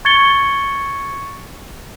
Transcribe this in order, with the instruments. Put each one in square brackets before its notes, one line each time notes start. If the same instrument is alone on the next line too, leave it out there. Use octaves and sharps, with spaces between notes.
[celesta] C#6 G#6 A6 C#7 G7